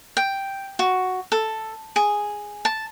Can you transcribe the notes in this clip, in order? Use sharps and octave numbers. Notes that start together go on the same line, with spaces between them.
G5
F#4
A4
G#4
A5